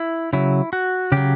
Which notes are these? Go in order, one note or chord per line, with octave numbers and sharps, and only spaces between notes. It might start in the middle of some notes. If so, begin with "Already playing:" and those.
Already playing: E4
C#3 F#3 E4
F#4
C#3 F#3 G4